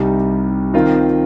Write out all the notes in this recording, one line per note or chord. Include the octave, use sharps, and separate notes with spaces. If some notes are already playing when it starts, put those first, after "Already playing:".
Already playing: C2 C3 G3 D#4
D#3 C4 F4 A#4